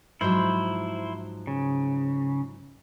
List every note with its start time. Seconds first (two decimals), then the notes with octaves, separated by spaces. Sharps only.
0.21 G#2 F3 F#3 E4 C5
1.47 C#3